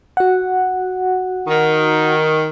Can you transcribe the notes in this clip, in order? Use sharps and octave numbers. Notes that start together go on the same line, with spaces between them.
F#4 F#5
D#3